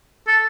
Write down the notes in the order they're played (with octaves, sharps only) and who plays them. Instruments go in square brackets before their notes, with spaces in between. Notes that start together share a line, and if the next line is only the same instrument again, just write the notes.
[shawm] A4